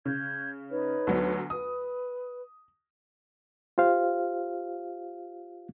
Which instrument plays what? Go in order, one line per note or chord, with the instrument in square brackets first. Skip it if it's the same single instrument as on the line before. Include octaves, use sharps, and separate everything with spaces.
[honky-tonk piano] C#3 [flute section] G6 G#6
[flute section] D#4 B4 C#5
[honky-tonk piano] D2 F#3 B3
[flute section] B4 [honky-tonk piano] D#6
[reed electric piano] F4 G4 C5 F5